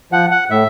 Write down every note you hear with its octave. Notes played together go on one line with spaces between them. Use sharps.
F3 F#5
F#5
A2 E5